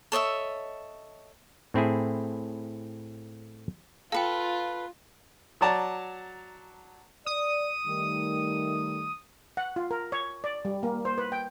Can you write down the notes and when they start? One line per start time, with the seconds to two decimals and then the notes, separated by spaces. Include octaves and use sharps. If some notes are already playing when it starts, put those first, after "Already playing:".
0.12 A4 C#5 D#5 E5
1.74 A2 C4 E4 G#4
4.12 F4 A4 B4 F5 G5
5.61 F#3 C#5 D5 A5 A#5
7.26 D5 D#6
7.88 D#3 G3 A3
9.57 F#5
9.76 F4
9.91 A#4
10.12 C#5
10.44 D5
10.65 G3
10.83 A#3
11.05 C5
11.18 B4
11.32 G5